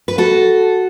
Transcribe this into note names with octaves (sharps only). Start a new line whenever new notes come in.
B4
F#4 A4